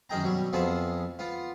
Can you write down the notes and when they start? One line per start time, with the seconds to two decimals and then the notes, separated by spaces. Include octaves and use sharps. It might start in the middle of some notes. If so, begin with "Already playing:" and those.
0.10 F#2 D#3 D#4 G#4 G5 A#5
0.24 B2 F#3 G3
0.53 F2 F3 B3 C4 G#4 A5
1.19 B3 F4